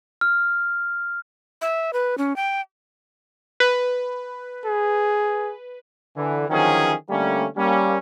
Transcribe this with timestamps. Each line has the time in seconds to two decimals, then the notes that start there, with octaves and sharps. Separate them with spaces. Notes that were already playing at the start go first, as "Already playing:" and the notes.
0.21 F6
1.62 E5
1.93 B4
2.18 C#4
2.36 G5
3.60 B4
4.65 G#4
6.16 D3 E3
6.49 D3 D#3 F3 F#3 C#4 G#4
7.09 D3 G3 A3 A#3 C#4
7.57 G3 A#3 C#4